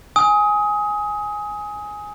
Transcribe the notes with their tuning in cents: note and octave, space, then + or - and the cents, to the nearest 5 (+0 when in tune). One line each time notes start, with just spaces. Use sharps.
G#5 +0 D#6 +25